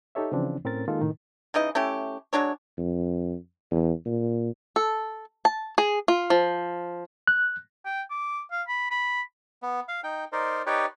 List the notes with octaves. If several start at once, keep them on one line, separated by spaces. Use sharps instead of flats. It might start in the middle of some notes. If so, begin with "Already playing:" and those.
D#4 G4 A4 C#5 E5
C#3 E3 F3 C4 D4
A2 C4 C#4 A#4 A6
D#3 G#3 A#3 D#4 F4 A4
A2 C3 D#3
C#3 E3 D#4 D#5
A3 C#4 E4 G4
F#3 G#3 D4 C#5
F2
E2
A#2
A4
A5
G#4
F4
F3
F#6
G5
D6
F5
B5
B5
B3
F5
D#4 G5
D#4 A#4 C5 D5
D#4 G4 B4 C#5 D5